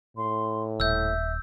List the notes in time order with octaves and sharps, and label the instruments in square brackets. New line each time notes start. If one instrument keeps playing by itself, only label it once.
[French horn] A2 [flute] C6
[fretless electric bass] D#1 [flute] E5 [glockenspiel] E6 G6